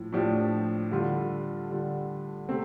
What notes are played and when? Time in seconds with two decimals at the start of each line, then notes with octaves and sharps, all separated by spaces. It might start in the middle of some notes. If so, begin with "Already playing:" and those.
Already playing: A2 F3
0.12 A2 F3 D4 G4
0.91 D3 G3 F4
1.70 D3 G3 F4
2.49 C3 A3 C4